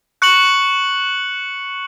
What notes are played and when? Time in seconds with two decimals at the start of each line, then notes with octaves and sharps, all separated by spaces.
0.22 C#6 F#6 C#7 F#7